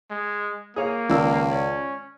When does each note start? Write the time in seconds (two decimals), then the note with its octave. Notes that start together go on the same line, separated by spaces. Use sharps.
0.10 G#3
0.76 A#3 G#4 C#5 F5
1.09 C#2 D#3 D5 E6
1.51 C#4 D5